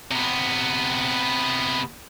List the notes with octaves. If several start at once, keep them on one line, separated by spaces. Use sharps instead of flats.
C3 B3